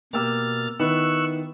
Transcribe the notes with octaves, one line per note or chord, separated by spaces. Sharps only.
B2 A#3 G4 E6 F6 A6
D#3 B3 E4 C#6 E6 F#6